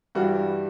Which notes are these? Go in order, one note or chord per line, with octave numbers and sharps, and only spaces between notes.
G2 E3 G3 F#4